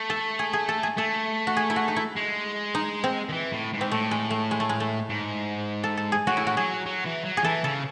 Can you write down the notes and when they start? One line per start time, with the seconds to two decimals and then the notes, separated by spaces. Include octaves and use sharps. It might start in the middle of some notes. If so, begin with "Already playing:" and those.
Already playing: A3
0.10 A4
0.39 G#4
0.53 G#4
0.69 A4
0.83 G#4
0.97 A3 A4
1.47 F#4
1.57 G#4
1.70 E4
1.76 F#4
1.88 D#4
1.96 E4
2.16 G#3
2.75 D#4
3.04 C4
3.29 D#3
3.33 E3
3.52 A2
3.73 G#2
3.81 C4
3.91 A2 A3
4.11 G#3
4.31 A3
4.51 G#3
4.60 A3
4.69 G#3
4.80 A3
5.09 G#2
5.84 A4
5.97 A4
6.12 G#4
6.27 A2 F#4
6.37 E4
6.47 F#4
6.56 F#3 G#4
6.86 F#3
7.06 E3
7.25 F#3
7.37 G#4
7.44 E3 A4
7.64 C#3 A4